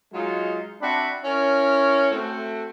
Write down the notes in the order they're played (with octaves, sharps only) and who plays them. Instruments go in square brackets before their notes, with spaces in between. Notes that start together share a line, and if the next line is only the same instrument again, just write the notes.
[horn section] F#3 G#3 D#4 F4
C4 D4 F#4 D5 E5 B5
C#4 E4 A#4 C#5
A3 C4 F#4